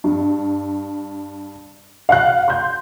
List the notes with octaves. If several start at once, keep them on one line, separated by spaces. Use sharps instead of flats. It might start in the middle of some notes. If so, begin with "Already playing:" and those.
G2
F5 F#5 F#6
C6 G6